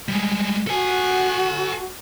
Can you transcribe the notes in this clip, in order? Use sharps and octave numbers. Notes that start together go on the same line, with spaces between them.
G3 G#3
F#4 A4 G#5